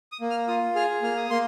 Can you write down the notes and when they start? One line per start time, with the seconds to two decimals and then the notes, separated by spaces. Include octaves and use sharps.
0.12 D#6
0.21 A#3
0.30 F6
0.48 F4 D#6
0.75 G#4 F6
1.02 A#3 F6
1.17 D#6
1.30 A#3 C6